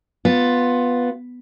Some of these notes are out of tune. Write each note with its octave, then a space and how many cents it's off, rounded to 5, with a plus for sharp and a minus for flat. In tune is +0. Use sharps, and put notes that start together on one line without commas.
B3 +0 F4 +10